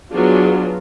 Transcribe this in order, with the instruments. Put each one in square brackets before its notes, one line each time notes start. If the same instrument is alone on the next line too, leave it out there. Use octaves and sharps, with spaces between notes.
[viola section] F#3 B3 D4 F4 G#4